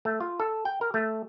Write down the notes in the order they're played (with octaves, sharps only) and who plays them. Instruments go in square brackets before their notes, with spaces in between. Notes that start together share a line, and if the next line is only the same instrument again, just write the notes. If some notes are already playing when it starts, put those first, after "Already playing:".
[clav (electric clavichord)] A3
F4
A4
G5
A#4
A3